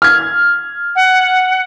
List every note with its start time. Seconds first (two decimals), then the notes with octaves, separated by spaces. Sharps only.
0.02 F6 G#6
0.96 F#5